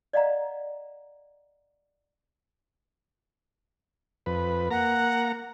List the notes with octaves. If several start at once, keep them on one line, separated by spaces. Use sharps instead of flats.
D5 D#5 F5 F#5 A#5
F2 B4
A#3 F#5 A#5